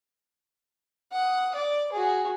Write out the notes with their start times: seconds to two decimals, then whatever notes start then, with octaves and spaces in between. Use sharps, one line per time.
1.12 F#5 D#6
1.55 D5
1.92 F#4 G#4